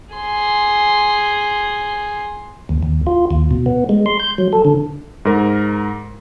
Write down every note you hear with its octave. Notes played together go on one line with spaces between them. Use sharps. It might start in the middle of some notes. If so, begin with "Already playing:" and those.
G#4 C6
D#2
D#2
F4
D#2
B2
B3
G#3
C6
G6
F#3
A4
D3
G#2 A#4